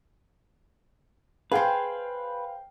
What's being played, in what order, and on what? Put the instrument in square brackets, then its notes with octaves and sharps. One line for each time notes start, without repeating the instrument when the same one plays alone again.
[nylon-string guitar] G#4 C5 [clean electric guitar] B4 [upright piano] F5 G5 C7